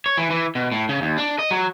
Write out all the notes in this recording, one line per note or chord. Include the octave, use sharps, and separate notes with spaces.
C#5
E3
E3
B2
A2
C#3
D#2
D4
D#5
F#3